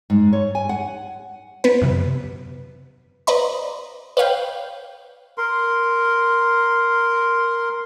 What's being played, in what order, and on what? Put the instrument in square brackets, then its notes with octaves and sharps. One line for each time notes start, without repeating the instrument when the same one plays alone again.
[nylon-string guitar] G#2
C#5
G#5
F#5
[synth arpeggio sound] B3 B4
F#2 C3
B4 C5 D5 D#5 A#5 B5
B4 C#5 F5 G5
[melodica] A#4 C6